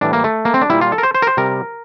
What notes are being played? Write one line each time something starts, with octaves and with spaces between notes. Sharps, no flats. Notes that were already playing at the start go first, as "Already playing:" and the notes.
A2 E3 G3 D4
A#3
A3
A#3
C4
D4
A#2 G3 E4
F4
A4
A#4
C5
C5
A#4
C5
C3 G3 A#4